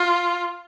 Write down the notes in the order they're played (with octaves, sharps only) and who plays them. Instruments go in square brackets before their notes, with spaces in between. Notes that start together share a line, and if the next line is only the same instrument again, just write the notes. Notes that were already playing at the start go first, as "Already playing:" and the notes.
Already playing: [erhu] F4